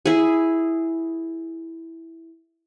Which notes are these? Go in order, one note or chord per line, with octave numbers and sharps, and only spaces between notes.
E4 G#4